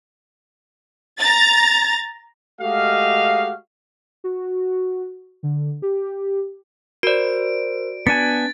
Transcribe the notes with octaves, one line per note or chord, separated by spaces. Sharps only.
A#5 A6
G#3 A3 F#4 G4 D#5 F5
F#4
D3
G4
F#4 A#4 C5 D5 D7
B3 D4 G#5 F#6 A6